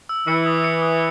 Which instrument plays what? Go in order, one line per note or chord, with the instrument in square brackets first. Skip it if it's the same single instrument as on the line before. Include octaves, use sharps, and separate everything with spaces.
[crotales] E6
[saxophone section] E3 [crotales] C#7
[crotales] D#6
C#7
D#6